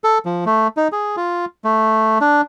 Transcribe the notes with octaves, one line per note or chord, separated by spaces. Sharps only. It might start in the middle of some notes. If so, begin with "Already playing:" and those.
A4
F3
A3
D#4
G#4
F4
A3
D4